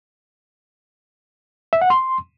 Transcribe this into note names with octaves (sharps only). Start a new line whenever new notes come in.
E5
F#5
C6